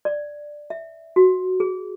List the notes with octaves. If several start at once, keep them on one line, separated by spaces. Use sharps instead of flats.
D5
E5
F#4
G#4